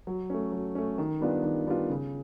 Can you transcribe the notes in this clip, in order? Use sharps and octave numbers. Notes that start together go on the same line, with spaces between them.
F#3
A3 C#4
F#3
A3 C#4
D#3
G3 B3 D4 F4
D#3
G3 B3 D4 F4
C#3